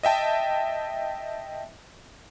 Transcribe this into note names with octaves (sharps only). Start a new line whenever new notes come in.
D#5 E5 G5 A5